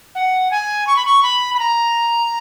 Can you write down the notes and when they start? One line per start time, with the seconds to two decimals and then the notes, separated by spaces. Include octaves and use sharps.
0.15 F#5
0.51 G#5
0.87 C#6
0.97 B5
1.05 C#6
1.23 B5
1.54 B5
1.59 A#5